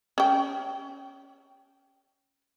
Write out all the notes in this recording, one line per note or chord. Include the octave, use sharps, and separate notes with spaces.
C#4 G5